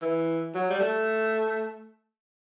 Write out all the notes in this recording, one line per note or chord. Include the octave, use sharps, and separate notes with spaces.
E3
F#3
G3
A3